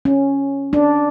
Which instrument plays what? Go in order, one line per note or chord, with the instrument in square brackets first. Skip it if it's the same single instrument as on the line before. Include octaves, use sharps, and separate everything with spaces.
[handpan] C#4
D4